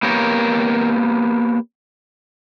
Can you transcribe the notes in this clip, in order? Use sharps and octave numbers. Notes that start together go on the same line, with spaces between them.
A#3 B3 G4 A#4 C#5